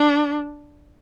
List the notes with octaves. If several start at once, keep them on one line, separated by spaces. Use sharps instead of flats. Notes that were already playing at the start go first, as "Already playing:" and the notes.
Already playing: D4